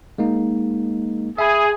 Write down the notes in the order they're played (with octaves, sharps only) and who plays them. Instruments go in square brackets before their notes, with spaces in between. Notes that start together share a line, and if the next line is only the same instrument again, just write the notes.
[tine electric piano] G#3 A#3 D#4
[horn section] G#4 [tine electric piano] E5 B5